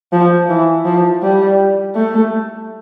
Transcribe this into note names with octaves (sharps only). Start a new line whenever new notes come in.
F3
E3
F3
G3
A3